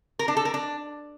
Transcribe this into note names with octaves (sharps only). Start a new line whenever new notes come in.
A#4
D4
A4
A#4
D4